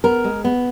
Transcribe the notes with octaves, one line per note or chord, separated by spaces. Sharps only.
B3 A#4
G#3
B3